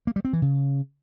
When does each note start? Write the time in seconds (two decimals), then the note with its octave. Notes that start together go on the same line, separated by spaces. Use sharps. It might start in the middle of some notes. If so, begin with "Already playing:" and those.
0.07 A#3
0.16 G3
0.25 C4
0.33 E3
0.42 C#3